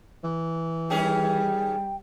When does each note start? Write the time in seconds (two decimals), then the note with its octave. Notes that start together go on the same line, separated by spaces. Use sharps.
0.24 E3
0.90 D#3 G3 C#4 G#4 G5